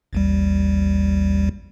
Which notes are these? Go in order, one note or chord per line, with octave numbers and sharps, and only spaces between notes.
A1 D#2 G3